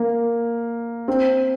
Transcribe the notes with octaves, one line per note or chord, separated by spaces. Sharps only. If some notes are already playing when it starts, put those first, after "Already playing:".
Already playing: A#3
C4